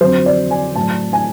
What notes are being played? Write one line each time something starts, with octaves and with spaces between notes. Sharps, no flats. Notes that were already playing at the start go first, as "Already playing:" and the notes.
F2 D3 F#3 C5
D5
G#5
A2 F#3 A5
G#5